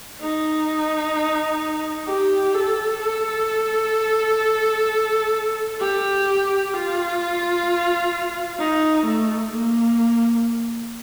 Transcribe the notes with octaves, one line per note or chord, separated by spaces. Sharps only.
D#4
G4
A4
A4
G4
F4
D#4
A3
A#3